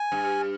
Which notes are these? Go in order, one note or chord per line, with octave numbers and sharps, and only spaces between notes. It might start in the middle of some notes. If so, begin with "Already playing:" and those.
Already playing: G#5
G2